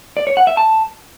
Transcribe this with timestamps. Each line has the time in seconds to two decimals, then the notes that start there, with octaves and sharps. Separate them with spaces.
0.17 D5
0.27 C#5
0.37 F#5
0.47 E5
0.57 A5